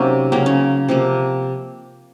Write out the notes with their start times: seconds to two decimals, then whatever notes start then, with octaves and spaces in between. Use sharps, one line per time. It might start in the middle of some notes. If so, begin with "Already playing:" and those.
Already playing: C3 F#3 A#3 C#4 D#4
0.32 C#3 F#3 A#3 C4
0.46 C#4
0.89 C3 F3 A#3